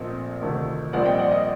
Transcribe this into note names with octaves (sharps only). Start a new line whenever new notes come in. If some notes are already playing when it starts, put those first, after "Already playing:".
Already playing: A#1 A#2 A3 C4 D#5
D2 C3 D#3 A3
A#1 A#2 G3 C4 D5 F#5
D#5 G5
D5 F#5
D#5